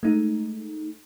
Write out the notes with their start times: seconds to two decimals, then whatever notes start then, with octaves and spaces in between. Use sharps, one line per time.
0.03 G#3 A3 D#4